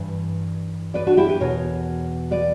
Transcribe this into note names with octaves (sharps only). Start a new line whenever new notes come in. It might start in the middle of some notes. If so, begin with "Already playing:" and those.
Already playing: G2 E3
B4 D5
D4 F#4
E4 G4
G4 B4
E2 B2 A#4 C#5
B4 D5